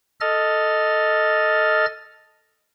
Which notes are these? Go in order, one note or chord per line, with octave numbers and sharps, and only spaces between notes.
A4 D#5 F6 A6